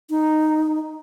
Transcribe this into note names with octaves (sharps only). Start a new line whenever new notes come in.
D#4